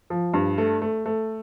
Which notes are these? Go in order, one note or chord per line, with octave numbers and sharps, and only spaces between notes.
F3
G2
A3
A3
A3